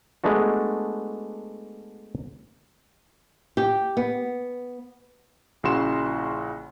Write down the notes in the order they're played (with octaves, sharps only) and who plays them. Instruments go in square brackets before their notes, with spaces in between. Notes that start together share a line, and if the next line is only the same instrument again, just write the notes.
[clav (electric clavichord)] G#3 A3 B3 D4 F#4
[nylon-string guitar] G4
B3
[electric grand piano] A#1 C#3 E4 F#4 C6 E7